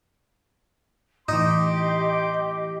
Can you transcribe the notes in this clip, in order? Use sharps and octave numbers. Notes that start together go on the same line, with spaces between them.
A2 E3 D#4 G4 D#5 C6 D6